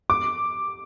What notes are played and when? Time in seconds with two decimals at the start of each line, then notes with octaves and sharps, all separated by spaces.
0.10 D6